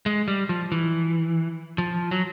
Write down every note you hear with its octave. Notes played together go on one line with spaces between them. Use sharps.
G#3
G3
F3
E3
F3
F#3